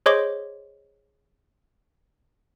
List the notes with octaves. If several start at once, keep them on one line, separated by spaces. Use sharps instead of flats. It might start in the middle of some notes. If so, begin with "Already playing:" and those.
G#4 C5 C#5 D#5 C6 D6